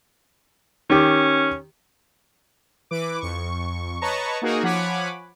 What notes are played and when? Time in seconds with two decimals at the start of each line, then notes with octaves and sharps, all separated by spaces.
0.90 D#3 C#4 G4
2.91 E3 B4 D6
3.20 F2 C#6
4.01 B4 C#5 D#5 A5 A#5 C#6
4.42 A#3 D#4 F#4 G#4 A#4
4.63 F3 C#5 F#5 G#5 B5 D6